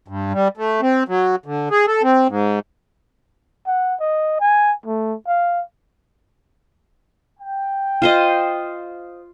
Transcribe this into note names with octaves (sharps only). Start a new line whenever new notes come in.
G2
G3
A3
C4
F#3
D3
G#4
A4
C4
G#2
F#5
D#5
G#5
A3
F5
G5
F4 C5 D#5